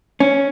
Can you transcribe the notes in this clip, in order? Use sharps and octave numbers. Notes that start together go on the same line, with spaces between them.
C#4